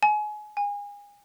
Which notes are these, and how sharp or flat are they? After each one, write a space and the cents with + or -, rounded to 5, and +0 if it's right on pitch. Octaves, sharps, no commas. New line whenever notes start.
G#5 +25
G#5 -30